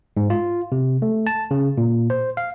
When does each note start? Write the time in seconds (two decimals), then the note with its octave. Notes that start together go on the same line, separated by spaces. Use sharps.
0.17 G#2
0.30 F4
0.72 C3
1.02 A3
1.27 A5
1.51 C#3
1.78 A#2
2.10 C5
2.37 F5